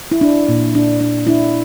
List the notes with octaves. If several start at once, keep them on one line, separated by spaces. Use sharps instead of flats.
E4
D4
A#2
D4
D4
D4 E4